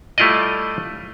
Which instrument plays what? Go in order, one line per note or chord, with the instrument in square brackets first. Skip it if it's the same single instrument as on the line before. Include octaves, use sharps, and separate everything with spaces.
[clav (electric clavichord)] G3 A3 E4 F4 D5 D#5